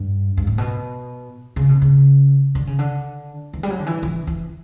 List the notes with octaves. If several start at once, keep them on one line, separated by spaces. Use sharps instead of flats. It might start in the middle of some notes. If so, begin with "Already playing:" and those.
Already playing: G2
G2
A2
B2
C#3
B2
C#3
D3
C#3
D3
E3
G3
F#3
D3
E3
E3
E3